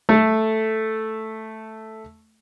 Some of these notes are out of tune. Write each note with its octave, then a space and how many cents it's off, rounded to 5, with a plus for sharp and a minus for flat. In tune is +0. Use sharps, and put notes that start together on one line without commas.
A3 +0 A4 +0